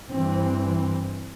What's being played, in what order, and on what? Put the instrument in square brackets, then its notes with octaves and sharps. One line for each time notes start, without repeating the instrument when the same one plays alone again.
[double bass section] G2 E3 C4